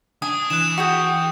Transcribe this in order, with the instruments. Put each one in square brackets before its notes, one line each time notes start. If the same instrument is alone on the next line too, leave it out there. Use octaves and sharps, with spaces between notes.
[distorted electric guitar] D4 [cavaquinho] G#5 [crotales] D#6
[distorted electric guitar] E3 [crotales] F#6 E7
[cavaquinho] F#4 G#4 G5